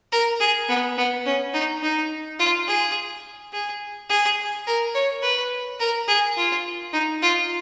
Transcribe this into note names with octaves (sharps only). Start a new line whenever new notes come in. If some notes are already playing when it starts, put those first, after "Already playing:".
A#4
G#4
B3
B3
C#4
D#4
D#4
F4
G#4
G#4
G#4
A#4
C#5
B4
A#4
G#4
F4
D#4
F4